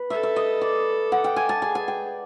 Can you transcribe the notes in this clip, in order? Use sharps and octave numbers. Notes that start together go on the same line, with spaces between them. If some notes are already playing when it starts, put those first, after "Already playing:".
Already playing: B4
A4 E5
E5
D#5
D5
F#5
G5
G#5
A5
G#4 G#5
G#5
G5